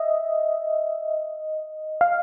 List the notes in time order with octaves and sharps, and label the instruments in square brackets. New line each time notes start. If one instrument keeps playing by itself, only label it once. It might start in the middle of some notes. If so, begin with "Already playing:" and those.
Already playing: [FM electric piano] D#5 E5
F5